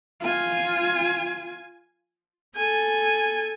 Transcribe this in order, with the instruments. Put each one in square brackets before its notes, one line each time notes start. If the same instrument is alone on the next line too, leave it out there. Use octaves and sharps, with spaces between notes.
[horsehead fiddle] F4 G#5
[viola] A4 G#5